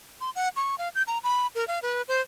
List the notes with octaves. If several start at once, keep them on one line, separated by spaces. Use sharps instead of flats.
C6
F#5
C#6
F5
G6
A#5
B5
A#4
F5
B4
C5